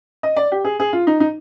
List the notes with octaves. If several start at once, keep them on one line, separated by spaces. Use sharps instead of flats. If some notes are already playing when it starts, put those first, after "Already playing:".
D#5
D5
G4
G#4
G#4
F4
D#4
D#4